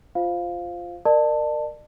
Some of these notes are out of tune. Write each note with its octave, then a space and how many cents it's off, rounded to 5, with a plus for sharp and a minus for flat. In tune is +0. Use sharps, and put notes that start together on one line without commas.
F4 +0 C5 +0 F5 +0
A#4 -5 D5 +40 A5 +15